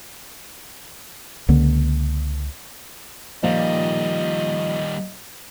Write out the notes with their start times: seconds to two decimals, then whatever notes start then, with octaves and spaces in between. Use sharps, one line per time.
1.49 C#2 D3 A#3
3.43 A#2 D#3 F3 G3 D#5 F5